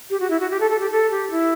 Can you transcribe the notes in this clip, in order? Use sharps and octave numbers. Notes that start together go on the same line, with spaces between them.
G4
F#4
E4
F#4
G4
A4
A4
G4
A4
G4
E4